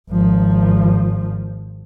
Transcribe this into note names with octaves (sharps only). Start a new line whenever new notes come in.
G#1 F3